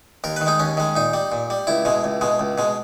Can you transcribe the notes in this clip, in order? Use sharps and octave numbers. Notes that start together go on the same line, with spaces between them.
D#2 A#4
D#3 B4
G#3 D#4
D#2 C#4
D#3 G#3
A#2 D#4
G3
A#2
G3
C#2 E4
B2 G#3
C#2
B2 G#3
C#2
B2 G#3